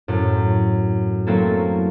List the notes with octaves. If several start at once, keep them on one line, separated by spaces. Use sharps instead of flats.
F#2 A2
F#3 A3 A#3 C4 E4 A4